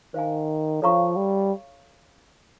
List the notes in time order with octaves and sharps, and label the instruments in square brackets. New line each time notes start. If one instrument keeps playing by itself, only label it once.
[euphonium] D#3 [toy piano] C5 F5 G#5
[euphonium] F3 [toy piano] A4 C#5 F5 A#5 C#6
[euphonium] G3